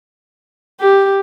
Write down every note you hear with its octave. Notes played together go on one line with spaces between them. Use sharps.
G4